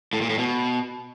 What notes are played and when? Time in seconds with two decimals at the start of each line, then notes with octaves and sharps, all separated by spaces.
0.13 A2
0.21 A#2
0.30 A2
0.38 B2